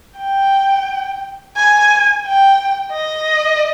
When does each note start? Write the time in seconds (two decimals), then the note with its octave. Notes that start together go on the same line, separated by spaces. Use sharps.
0.19 G5
1.56 G#5
2.25 G5
2.92 D#5